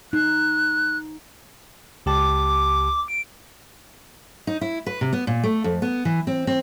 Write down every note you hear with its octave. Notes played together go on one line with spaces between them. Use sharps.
D#4 F#6
C#2 G4 A5 D6
D7
D#4
E4
B4
C3
B3
A#2
A3
F2
B3
E3
C4
C4